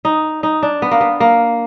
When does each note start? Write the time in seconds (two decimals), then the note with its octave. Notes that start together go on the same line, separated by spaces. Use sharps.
0.05 D#4
0.43 D#4
0.63 D4
0.82 B3
0.91 A#3
1.01 B3
1.20 A#3